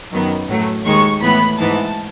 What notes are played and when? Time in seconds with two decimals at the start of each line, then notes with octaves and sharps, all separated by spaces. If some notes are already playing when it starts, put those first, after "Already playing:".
0.11 F#2 D#3 F#3 B3
0.48 A2 F#3 A3
0.85 D#2 D#3 G#3 C#6
1.22 A2 E3 B3 B5
1.59 G#2 E3 B3 A5